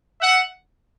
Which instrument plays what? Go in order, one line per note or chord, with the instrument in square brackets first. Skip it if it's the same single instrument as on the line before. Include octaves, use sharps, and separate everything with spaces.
[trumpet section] E5 F#5